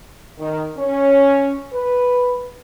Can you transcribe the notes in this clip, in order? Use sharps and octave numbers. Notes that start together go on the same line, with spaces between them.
D#3
C#4
B4